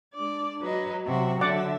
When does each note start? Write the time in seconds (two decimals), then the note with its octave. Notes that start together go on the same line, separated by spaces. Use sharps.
0.14 G#3 D4 D5
0.62 F#3 B4 D#5
1.06 C3 F#3 F#4 E5
1.41 D3 D5 E5 F#5 D6